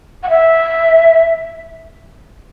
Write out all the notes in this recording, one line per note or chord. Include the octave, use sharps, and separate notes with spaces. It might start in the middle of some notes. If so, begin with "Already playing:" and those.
F#5
E5